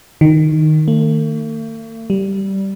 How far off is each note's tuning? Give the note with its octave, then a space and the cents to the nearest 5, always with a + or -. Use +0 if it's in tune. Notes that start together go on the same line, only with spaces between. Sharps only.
D#3 -5
A3 +45
G3 -15